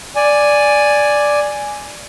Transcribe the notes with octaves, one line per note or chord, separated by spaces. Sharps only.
D5 G#5